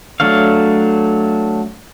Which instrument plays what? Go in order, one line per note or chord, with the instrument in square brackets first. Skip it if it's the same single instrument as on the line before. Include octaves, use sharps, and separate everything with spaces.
[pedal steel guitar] F#3 A3 D4 C#5 F5